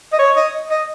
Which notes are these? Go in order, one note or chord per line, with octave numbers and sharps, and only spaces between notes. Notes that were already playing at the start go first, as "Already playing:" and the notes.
D#5
C#5
D#5
D#5